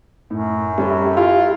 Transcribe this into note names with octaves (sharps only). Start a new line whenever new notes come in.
F#2 A2
G3 C#4 G4 A4 E5
E4 F4